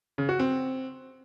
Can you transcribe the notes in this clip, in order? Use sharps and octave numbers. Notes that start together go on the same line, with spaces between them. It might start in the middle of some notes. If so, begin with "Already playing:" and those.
C#3
F#4
C4